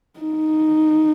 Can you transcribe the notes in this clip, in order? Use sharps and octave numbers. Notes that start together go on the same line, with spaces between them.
D#4